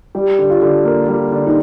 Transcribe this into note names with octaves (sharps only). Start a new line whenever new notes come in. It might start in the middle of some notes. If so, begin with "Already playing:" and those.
G3 G4
D3
F4
D3
A#3
G3
D3
D#4